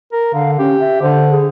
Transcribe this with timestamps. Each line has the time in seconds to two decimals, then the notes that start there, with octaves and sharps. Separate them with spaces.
0.12 A#4
0.33 D3 F5
0.59 C#4 G4
0.80 E5
1.02 D3 C5
1.30 G#4